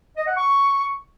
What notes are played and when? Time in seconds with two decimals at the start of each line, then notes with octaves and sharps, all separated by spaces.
0.17 D#5
0.27 F#5
0.37 C#6